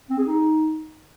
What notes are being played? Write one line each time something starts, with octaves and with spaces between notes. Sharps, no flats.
C4
G#4
D#4